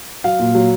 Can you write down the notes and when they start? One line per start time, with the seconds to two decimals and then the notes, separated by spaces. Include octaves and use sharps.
0.24 F#3 F5
0.39 A#2
0.55 F#3